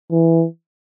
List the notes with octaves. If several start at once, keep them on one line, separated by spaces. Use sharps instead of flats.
E3